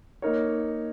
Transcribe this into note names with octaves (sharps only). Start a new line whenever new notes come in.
A#3 D#4 A#4 C#5